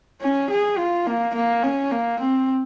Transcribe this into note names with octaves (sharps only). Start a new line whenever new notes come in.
C#4
G#4
F4
A#3
A#3
C#4
A#3
C4